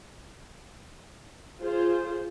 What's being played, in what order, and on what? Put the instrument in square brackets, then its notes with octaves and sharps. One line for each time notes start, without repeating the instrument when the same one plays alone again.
[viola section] F4 G#4 C5